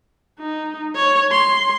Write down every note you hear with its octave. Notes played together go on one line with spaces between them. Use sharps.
D#4
C#5
C6